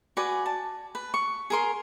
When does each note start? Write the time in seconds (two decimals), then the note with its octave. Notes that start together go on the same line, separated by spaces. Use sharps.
0.17 F#4 B4 D5 G#5
0.46 A5
0.95 B4
1.14 C#6
1.50 G#4 A#4 C6